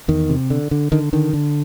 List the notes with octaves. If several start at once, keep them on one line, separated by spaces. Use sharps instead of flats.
E2 D#3
C3
D3
D3
D3 D#3
D3 D#3
D3